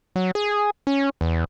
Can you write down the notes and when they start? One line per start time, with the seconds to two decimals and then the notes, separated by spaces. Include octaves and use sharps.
0.16 F#3
0.35 G#4
0.87 C#4
1.21 E2